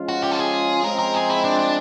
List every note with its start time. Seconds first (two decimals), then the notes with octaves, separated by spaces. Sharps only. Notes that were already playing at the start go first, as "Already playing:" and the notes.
Already playing: F3 G#3 C#4 F4
0.08 F#4
0.23 G4
0.31 A4
0.39 G#4
0.84 F3 G#3 C4 A#4
0.99 A#4
1.14 G#4
1.29 E4
1.44 D4
1.59 D4